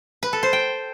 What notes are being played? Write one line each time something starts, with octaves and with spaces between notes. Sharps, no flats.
B4
A4
C5
G5